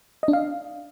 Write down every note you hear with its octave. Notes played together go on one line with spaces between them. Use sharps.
D#5
D4
F5